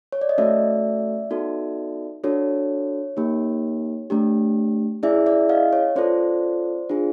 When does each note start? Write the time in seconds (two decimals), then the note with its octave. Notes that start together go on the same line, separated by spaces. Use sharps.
0.12 C#5
0.21 D5
0.29 D#5
0.38 A3 C#4 F#4 A4 D5 E5
1.31 B3 D#4 F#4 A4
2.24 D4 F#4 A4 C#5
3.17 A#3 D#4 G4
4.10 A3 D4 G4
5.03 C#4 E4 G#4 D5 E5
5.26 D5 E5
5.49 D#5 F5
5.73 C#5
5.96 C#4 F4 A4 C5 D5
6.89 D4 F4 G#4